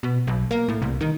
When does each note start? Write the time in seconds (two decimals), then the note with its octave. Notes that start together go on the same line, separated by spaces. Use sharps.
0.03 B2
0.27 B1
0.51 A#3
0.68 A2
0.82 C2
1.01 D#3